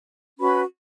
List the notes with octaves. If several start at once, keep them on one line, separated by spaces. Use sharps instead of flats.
C#4 F#4 B4 B5